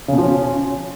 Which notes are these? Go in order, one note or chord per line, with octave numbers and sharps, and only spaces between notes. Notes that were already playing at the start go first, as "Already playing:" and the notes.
C#3
B2
F3
C#4